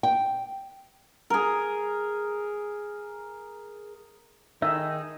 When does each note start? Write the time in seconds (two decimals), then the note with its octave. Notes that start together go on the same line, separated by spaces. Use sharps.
0.03 G5
1.30 G#4 A#4
4.62 D#3 D#4 G#4 E5